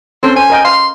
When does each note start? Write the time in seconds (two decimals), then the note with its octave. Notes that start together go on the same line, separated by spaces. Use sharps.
0.23 C4 C#4 A4 C5
0.36 C5 G#5
0.50 A#4 D#5 G5
0.65 F5 C6